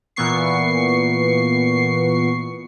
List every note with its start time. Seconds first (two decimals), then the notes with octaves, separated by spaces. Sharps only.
0.16 A#2 E3 B3 C#6 C7